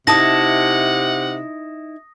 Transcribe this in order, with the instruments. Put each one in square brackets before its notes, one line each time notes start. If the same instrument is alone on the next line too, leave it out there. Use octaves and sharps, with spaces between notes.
[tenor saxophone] C3 [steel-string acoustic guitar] D#4 E4 A5 [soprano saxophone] F#5 [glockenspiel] D#6 A#6